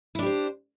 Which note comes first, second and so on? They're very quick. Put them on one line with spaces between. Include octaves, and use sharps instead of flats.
E4 D4 G4 C5